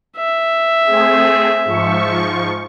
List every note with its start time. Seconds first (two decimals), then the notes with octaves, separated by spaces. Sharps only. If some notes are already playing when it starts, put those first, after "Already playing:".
0.17 E5
0.86 A3 C4 G#4
1.65 G#2 F3 C#6